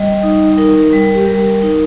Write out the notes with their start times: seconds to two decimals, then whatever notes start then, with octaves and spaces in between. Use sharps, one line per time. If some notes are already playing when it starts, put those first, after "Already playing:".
Already playing: G3 D#5
0.23 D#4
0.58 D#4 A#4
0.93 G3
1.15 G4
1.27 G3 A#4
1.62 D#4